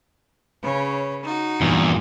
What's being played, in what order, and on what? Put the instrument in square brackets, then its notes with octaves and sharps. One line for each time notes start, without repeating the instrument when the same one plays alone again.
[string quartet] C#3 B4 C#5
D#4 F#4
[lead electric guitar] E2 [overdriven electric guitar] G2 A#2